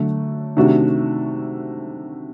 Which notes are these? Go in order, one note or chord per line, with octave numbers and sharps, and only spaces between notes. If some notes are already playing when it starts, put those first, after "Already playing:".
Already playing: D3 F#3 A3 D4
C3 D#3 A3 D4 F#4